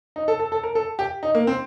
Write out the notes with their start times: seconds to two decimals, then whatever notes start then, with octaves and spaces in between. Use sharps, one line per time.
0.16 D#4
0.28 A4
0.40 A4
0.52 A4
0.63 A#4
0.75 A4
0.99 G4
1.23 D#4
1.35 A#3
1.47 C4